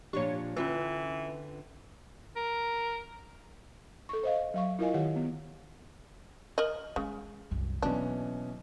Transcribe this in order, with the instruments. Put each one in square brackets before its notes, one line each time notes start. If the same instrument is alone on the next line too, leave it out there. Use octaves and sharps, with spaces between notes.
[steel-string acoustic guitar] A#2 F3 D4 [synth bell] G4 [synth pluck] C#5 C#6
[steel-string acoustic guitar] D3 [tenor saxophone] E3 [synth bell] C#4 F4 B4
[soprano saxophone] A#4
[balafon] A4 C#6
C5 D#5 F5
F#3 F5 C#6
E4 F4 A#4 D#5 F5 G#5
D#3 G4 F#5
B3
[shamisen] A#4 D#5 [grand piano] F#7
[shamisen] C#3 [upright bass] G#3
[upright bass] C2 F#2
[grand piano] B2 E3 C#4 [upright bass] F#3 A#3 [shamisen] D4